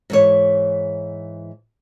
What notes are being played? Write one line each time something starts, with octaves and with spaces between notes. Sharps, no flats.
G#2 E3 C#5